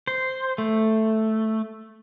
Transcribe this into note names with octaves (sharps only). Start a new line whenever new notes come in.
C5
A3